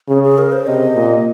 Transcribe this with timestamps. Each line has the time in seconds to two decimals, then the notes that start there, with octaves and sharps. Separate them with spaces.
0.09 C#3 G#4
0.24 G#4
0.38 A#4
0.52 C5
0.67 C3 D#5
0.95 A#2